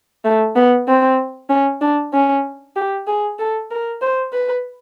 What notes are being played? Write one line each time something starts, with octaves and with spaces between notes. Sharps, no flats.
A3
B3
C4
C#4
D4
C#4
G4
G#4
A4
A#4
C5
B4